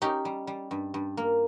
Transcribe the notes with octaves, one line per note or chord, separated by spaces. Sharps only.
C#4 D#4 G4
G3
G3
G2
G2
A#3